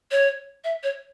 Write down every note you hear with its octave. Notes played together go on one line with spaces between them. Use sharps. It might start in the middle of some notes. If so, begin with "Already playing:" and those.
C#5
E5
C#5